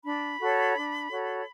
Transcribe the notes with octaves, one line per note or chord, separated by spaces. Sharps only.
D4 B5
F#4 A4 C#5
D4
F#4 A4 C#5